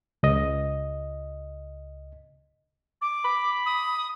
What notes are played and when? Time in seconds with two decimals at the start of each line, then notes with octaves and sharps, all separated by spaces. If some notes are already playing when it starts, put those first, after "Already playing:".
0.23 C#2 D#5
3.01 D6
3.25 B5
3.65 D#6